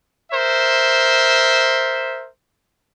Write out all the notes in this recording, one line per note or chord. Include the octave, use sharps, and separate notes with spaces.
A#4 C5 E5